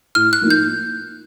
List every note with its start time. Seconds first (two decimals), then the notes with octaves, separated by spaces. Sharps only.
0.15 A2 F6
0.33 F#6
0.41 F3 A#3 D#4
0.50 G6